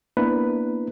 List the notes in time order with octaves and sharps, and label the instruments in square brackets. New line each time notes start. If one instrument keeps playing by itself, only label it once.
[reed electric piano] A#3 B3 D4 E4 A#4 B4